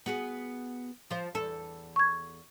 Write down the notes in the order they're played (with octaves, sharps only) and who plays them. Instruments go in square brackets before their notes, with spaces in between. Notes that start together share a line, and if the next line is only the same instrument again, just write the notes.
[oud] B3 F#4 G#4
F3 C5
E2 A4
[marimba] C#6 G#6